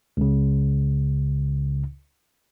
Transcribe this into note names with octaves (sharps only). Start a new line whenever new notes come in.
C#2 C#3